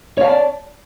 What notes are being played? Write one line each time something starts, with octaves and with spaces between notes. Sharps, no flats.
C#5 D5 F5 A5